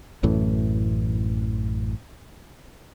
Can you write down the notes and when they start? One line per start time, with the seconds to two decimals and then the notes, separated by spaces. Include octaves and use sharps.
0.23 A1 F#2 A2 E3